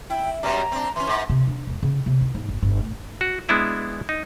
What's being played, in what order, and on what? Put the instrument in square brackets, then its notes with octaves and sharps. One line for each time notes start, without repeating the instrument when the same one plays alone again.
[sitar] E4 [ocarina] G5
[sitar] F#2 B2 G3 [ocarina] A#5
[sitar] C4 D4
[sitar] E3 C#4 [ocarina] C6
[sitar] G#2
[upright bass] C3
D4
E1
C#3
C3
D#3
G#2
G1
G1
A2
[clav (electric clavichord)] F#4
G#3 B3 D4 E4 B4
D#4